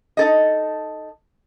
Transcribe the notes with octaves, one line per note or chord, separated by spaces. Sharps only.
D#4 A4 D#5